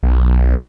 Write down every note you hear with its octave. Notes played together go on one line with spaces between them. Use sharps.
B1